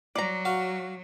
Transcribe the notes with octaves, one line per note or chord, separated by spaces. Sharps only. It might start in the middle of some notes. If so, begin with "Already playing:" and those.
F#3 D5 A#5
F#4 F5